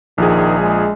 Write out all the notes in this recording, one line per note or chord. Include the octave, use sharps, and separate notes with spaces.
A#1 D#3 F3 G#4
G#3